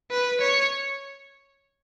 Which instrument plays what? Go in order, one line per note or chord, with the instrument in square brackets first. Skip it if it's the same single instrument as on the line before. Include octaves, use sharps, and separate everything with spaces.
[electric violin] B4
C#5